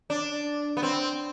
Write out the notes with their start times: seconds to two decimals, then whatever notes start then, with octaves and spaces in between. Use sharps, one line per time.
0.10 D4
0.77 B3
0.83 C4